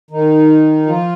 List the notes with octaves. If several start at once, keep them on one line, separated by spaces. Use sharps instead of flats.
D#3 D#4
F3 F4